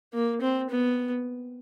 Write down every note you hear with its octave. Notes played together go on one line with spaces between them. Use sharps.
A#3
C4
B3